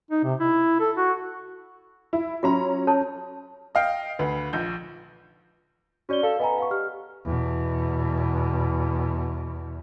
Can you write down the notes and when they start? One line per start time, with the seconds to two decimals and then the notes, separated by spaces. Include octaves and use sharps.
0.11 D#4
0.24 C3
0.40 E4
0.80 A4
0.97 F#4
2.13 E4
2.43 F#3 C#4 F4 F#4 A#5 C6
2.87 A4 C#5 A5
3.75 D#5 F5 G5
4.19 D2 B4
4.53 A#1 G6
6.09 C#4 F#4 D5 G7
6.23 A4 F5
6.39 B3 D#5 G#5 A#5
6.58 F5 C#6
6.71 G4 F6
7.25 E2 B2